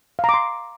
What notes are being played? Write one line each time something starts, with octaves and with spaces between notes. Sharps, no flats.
F5 A#5 C6 D6